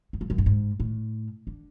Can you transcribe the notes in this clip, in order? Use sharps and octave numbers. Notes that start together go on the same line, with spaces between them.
E2
F2
F#2
G2
G#2
A2
D3